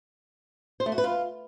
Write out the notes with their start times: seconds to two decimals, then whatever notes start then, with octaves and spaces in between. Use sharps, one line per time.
0.80 C5
0.86 A3
0.92 F#4
0.98 B4
1.04 F4